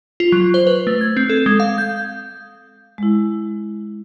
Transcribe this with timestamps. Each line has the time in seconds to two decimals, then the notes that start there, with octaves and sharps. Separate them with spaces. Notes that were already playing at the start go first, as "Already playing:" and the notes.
0.20 F4
0.32 F#3
0.54 C5
0.67 B4
0.87 A3
1.01 G#6
1.17 C4
1.29 A4
1.46 G#3
1.60 F5
1.78 G6
2.98 G#3 E4